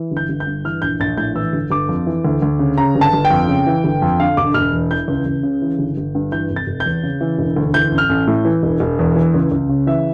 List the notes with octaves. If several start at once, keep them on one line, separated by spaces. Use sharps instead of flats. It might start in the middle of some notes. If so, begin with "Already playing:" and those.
Already playing: E3
G1
G6
G1
G6
G2
E3 F6
A#1 G6
A#1 A6
A2 G6
E3 E6
G1
G1 D6
F2
E3
D2
D2
C#3
C#3 A#5
G1
A5
G1
G5
F2
C#3
E3
G1
F2
D3 F5
E1 D6
E1 F6
E2
E3 G6
C#2
C#2
C#3
E3
G1
G1
G2
E3 G6
F1
A6
F1
G6
E2
C#3
E3
E1
D2
E3 G6
A1
F6
A1
A2
E3
E1
E1
E2
E3
C#2
C#2
C#3
E3 E5